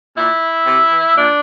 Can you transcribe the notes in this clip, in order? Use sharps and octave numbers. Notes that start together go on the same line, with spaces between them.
A#2 E4
C3
E3
A#2 D4